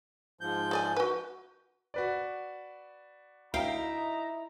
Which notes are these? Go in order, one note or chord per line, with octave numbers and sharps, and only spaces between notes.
G#2 F3 G6
G#4 D5 G#5
F#4 B4
F#4 B4 D5
D2 D#4 E4 F5 G5 A#5